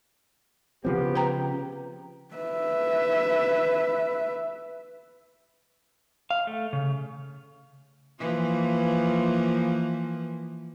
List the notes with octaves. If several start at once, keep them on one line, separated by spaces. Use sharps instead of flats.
C#3 F3 B3 C4 G4
B4 G5 A#5
B4 E5
F5
A3
C#3
E3 F3 A#3